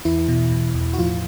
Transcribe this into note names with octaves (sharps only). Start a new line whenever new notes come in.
E2 E3 E4
B2
B2
E2
F#4
A2 F3 F4